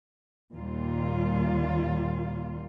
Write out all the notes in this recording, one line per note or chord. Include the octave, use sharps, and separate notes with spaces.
D#2 A#2 G3 F4